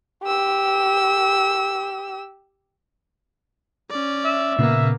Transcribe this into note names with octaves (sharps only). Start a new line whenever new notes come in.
G4 E6
C#4 D5
E5
A#2 C#3 A#3 B3